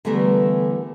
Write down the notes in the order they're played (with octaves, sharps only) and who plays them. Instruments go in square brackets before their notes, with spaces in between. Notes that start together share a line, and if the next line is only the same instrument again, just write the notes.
[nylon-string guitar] D3 E3 G3 A3 B3 A#4